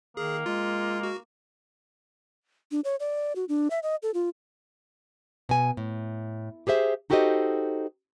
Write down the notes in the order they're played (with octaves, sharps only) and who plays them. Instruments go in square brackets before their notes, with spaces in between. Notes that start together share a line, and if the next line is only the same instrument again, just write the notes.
[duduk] D#3 [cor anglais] A#3 [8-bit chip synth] G#4
[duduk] G#3 [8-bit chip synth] F4
[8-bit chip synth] F#4
[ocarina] D4
C#5
D5
F#4
D4
E5
D#5
A4
F4
[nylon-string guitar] B2 G#5
A2
G4 G#4 C5 E5
D#4 F#4 G4 A4 C5 D#5